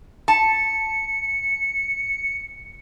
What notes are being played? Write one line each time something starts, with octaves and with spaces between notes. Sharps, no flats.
A5 C#7